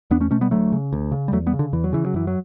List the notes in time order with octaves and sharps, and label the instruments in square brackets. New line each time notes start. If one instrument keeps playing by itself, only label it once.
[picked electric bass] E2 B3 D4
A3 C#4
B2 A3 C#4
G3 B3
D2 F#3 A3
C#3
D2
C#3
G3
E2 F#3 A3
G3 B3
C#3
D3
E2 E3
F#3
C#3 E3
F#3
F#2 E3
F#3